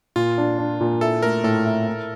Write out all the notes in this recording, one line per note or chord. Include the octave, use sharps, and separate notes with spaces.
A#2 F4
D4
D4
A#2
E4 A4
A3 A#4
A2 A4
E4
E4